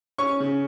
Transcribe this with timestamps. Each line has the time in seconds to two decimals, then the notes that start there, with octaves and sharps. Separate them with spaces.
0.18 C#4 C#6
0.40 C#3